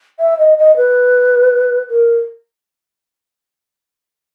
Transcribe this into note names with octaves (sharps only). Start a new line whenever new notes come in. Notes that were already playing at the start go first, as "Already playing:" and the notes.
E5
D#5
D#5
B4
A#4